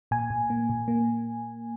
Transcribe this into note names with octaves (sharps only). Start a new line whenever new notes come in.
A#2 G#5
A#2
A#3
A#2
A#3